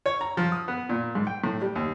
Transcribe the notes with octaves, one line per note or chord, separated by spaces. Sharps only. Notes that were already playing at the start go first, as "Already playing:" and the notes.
C#5
A#5
F3
D#6
B3
A#2
G#2
G5
A2
G3
D#2